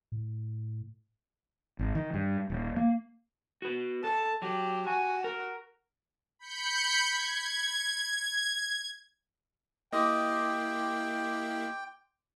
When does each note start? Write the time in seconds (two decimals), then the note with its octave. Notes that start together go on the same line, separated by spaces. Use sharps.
0.12 A2
1.79 G#1
1.95 D#3
2.14 G2
2.50 D#1
2.77 A#3
3.62 F#4 B4
4.04 A4 A5
4.42 F#3 G4
4.87 F#4 G#5
5.24 A#4
6.39 B5 G6 C#7
7.09 G#6
9.93 A#3 E4 G4 D#5 G5 C6 D6 D#6